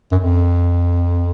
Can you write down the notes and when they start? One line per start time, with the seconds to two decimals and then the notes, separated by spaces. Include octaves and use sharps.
0.12 F#2
0.15 F2